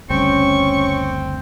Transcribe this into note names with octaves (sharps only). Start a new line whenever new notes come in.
F#1 D2 G3 C4 C#4 C#6